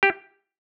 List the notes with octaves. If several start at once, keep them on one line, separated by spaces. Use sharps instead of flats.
G4